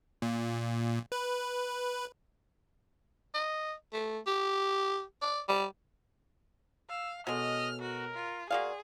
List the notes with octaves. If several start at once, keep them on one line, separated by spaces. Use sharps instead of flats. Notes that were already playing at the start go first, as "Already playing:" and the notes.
A#2
B4
D#5
A3
G4
D5
G3
F5 E6
B2 F#3 G#3 A4 D#5 F6
F#4 A#4
F4
A#3 F#4 G#4 D5 F5 F#5 C6